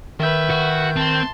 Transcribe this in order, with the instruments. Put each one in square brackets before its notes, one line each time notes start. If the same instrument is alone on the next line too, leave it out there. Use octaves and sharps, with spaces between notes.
[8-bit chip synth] D#3 G6 [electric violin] B4 E5
[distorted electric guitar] F#4
[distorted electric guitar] C4 [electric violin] A5 C6